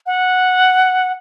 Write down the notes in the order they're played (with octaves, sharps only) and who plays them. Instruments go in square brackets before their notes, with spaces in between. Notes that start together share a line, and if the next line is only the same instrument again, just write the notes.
[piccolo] F#5